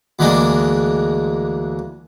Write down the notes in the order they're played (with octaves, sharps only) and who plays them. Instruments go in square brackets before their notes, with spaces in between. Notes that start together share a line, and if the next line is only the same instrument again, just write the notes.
[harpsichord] D2 E3 G#3 A#3 D4